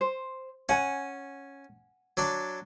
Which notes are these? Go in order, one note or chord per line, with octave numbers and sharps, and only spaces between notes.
C5
C#4 F#5 G#5
F#3 D4 D5